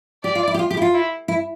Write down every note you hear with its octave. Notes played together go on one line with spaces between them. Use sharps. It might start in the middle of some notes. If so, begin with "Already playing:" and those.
G4 D5
F4
E4
G4
F4
G4
E4
F4
E4
E4